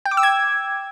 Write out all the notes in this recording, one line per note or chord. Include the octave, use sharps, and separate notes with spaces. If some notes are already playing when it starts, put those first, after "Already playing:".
G5
D6
E6
G#6